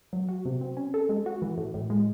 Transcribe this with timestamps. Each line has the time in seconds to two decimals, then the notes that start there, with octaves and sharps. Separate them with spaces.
0.13 F#3
0.29 F#4
0.45 C3
0.61 C4
0.77 C#4
0.94 A4
1.09 G#3
1.26 F#4
1.42 E3
1.58 A2
1.74 A2
1.90 G#3